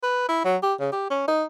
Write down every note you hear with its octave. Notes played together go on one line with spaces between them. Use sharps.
B4
E4
F#3
G4
C#3
G4
C#4
D#4